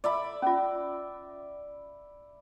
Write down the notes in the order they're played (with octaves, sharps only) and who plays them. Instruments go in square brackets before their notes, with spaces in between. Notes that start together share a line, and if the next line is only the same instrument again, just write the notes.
[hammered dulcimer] D5 E5 B5
[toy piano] C#4 F4